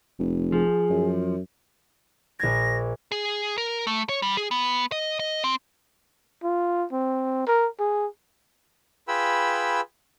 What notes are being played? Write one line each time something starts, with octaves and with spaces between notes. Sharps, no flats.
F1
F3 G#4
F#2
A#1 G#6 A#6
G#4
A#4
A3
C#5
G3
G#4
B3
D#5
D#5
C4
F4
C4
A#4
G#4
F4 G#4 B4 G5 B5 E6